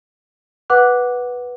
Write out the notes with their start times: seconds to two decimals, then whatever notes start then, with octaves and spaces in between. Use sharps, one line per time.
0.70 B4 F#5 D6 F#6